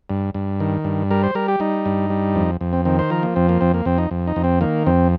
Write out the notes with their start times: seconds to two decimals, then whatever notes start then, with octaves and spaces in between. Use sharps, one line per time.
0.10 G2
0.34 G2
0.60 D#3
0.85 G2
1.11 G3 A#4
1.23 C5
1.35 G3 A#4
1.48 G4
1.60 G3 D#4
1.86 G2
2.10 G3
2.35 F2
2.61 F2
2.73 C4
2.85 D#3 C4
2.99 C5
3.10 F3 A#4
3.23 A#3
3.36 F2 C4
3.49 A#3
3.61 F2 C4
3.74 A#3
3.86 F2 C4
3.98 D#4
4.11 F2
4.27 D#4
4.36 F2
4.44 C4
4.61 D#3 A#3
4.87 F2 C4